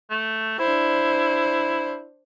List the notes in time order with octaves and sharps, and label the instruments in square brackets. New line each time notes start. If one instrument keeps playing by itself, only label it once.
[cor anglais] A3
[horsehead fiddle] D4 C5 [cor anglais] E4